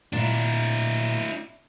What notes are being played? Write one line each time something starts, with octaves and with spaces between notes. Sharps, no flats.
A#2 D4 E4